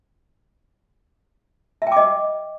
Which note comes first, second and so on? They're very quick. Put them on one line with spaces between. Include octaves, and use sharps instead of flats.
E5 G5 D6 D#5